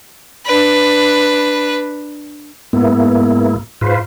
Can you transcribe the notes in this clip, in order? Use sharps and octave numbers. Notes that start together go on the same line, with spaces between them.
D4 B4
G#2 A#3 B3 E4
G#2 F4 B4 C5